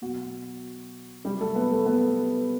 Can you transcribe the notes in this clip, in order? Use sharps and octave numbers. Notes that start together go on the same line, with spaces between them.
B2 F#3 F#4
C3 F#3 G3 G4
A3 A4
B3 B4
A3 A4
B3 B4